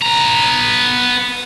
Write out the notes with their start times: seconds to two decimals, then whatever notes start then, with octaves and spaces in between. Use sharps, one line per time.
0.02 B3 A#5